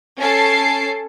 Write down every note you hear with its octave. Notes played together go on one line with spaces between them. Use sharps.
C#4 A4 A5 C7 D7